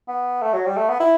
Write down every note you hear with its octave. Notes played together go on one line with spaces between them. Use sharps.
B3
A3
F#3
G3
A3
B3
E4